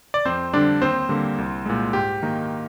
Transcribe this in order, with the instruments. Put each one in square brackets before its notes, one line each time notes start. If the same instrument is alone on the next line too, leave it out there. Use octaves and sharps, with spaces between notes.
[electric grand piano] D5
F2 C4 C5
D3 G3 D4 D5
D#2 C4 C5
D3 G3 A#3
C2
A#2 G#3
G#2 G4
D#3 A#3 D#4